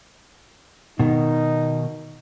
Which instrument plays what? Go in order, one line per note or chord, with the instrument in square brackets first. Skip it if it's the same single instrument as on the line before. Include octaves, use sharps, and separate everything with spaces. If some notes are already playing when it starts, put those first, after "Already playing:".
[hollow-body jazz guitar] B2 D#3 [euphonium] D#4